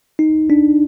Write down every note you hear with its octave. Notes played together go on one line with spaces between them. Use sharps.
D#4
D4